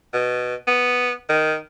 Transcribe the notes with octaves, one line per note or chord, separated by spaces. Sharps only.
B2
B3
D#3